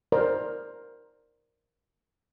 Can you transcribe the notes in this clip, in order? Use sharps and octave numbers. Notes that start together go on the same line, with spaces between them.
A#4 C5 D5